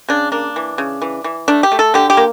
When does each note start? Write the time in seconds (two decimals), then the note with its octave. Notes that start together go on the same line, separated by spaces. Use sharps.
0.09 C#3 D4
0.32 A#3 D4
0.56 E3
0.78 C#3
1.02 E3
1.24 E3
1.48 A3 D4
1.63 G4
1.72 A3
1.79 A4
1.94 D3 G4
2.10 G4
2.17 A#3